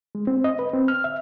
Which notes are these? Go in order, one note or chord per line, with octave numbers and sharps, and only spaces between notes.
G#3
C4
D#5
B4
C4
F6
E5